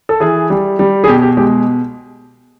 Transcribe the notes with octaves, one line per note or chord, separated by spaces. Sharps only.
A4
E3 G#4
G3
G3
G#4
B2 G4
G4
G#3 G4